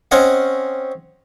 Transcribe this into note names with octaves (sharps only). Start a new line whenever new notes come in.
C4 C#4 C#5 D#5 F#5